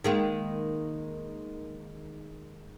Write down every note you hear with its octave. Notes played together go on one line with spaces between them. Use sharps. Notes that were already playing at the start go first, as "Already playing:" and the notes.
D#3 G#3 A#3